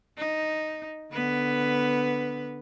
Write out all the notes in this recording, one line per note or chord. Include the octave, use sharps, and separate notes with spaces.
D#4
D3 B3 B4